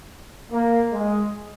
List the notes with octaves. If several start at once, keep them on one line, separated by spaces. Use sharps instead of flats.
A#3
G#3